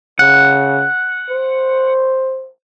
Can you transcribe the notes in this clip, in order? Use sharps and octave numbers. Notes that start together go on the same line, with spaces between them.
C#3 F#5
C5